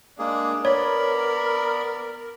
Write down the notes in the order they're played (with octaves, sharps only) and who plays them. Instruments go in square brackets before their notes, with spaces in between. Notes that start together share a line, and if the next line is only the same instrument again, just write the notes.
[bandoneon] G#3 A#3 G#4 [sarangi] D4
[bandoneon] B3 D5 B5 [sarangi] A#4 [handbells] C#5